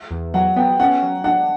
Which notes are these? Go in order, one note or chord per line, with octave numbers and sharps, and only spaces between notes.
E2
F#3 F#5
B3 G5
C#4 F#5
F#3
D4 F#5